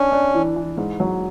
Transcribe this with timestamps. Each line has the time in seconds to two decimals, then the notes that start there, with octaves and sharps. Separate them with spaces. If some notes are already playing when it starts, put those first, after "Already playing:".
Already playing: C#4 D4
0.12 D4
0.34 E3
0.56 E3
0.77 G#2
1.00 F#3